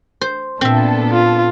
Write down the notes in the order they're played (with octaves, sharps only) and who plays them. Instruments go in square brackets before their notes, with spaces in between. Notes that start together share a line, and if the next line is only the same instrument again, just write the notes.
[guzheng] C5
[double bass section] A#2 [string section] B3 D4 A4 [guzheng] C4 E5
[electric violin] F4